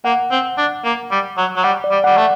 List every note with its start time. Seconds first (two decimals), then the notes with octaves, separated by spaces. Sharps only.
0.05 A#3 F#5
0.31 C4
0.57 D4
0.84 A#3
1.11 G3
1.37 F#3
1.56 F#3
1.64 G3 F#5
1.84 D5
1.91 G3
2.04 G3 F#5
2.17 A3